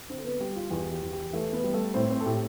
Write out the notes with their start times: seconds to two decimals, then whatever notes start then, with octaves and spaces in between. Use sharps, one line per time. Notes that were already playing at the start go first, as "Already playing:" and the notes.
0.09 D3 C4 C5
0.18 A4
0.24 B3 B4
0.40 G3 G4
0.56 F4
0.70 E2 G4
0.92 G4
1.02 E2
1.13 G4
1.33 E3 A3 A4
1.53 B3 B4
1.64 G3
1.74 A3 A4
1.94 A2 C4 C5
2.10 C4 C5
2.20 A4
2.26 A2 G4